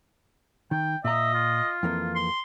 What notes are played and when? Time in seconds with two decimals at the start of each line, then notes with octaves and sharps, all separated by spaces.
0.71 D#3 G5
1.04 A#2 D#5 E5 A#5
1.34 F4
1.83 F2 E3 A#3
2.15 C6